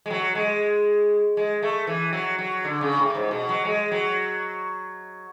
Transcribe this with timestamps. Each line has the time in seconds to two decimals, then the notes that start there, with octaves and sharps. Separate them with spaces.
0.06 G#3
0.10 F#3
0.35 G#3
1.37 G#3
1.62 A3
1.87 E3
2.13 F#3
2.38 F#3
2.64 D3
2.81 C#3
2.98 A2
3.15 G#2
3.31 B2
3.49 F#3
3.65 G#3
3.91 F#3